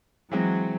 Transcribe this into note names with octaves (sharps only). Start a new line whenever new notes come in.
E3 F#3 G#3 C4